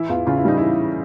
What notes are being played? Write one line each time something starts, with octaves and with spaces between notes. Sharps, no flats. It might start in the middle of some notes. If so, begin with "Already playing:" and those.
Already playing: E3 E4
E2 F4
C#3 F4
E4
G3 D#4
E4
E3